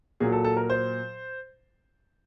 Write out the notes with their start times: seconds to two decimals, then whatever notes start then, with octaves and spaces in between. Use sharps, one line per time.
0.20 A#2 F#3 G#4
0.32 A4
0.45 A4
0.57 A#4
0.70 C5